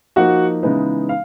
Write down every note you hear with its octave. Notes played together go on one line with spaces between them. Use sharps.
F3 A#3 D#4 F#4 F#5
C#3 E3 G#3 B3 D#4
F5